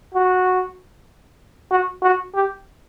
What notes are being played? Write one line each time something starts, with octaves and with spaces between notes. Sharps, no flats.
F#4
F#4
F#4
G4